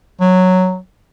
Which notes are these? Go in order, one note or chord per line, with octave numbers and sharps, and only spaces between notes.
F#3